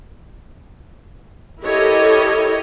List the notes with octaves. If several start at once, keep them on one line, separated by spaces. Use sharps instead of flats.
E4 G4 A4 A#4 C#5 D#5